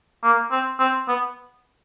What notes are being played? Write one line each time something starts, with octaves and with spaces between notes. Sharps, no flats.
A#3
C4
C4
B3